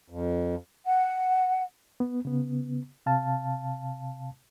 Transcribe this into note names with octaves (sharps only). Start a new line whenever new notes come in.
F2
F#5
B3
C#3 B3
C3 F5 A5